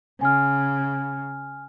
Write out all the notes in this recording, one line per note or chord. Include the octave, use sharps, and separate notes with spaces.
C#3 G#5 F6